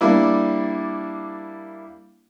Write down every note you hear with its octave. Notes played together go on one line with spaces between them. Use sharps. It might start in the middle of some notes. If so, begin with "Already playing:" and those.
G3 A#3 D4 E4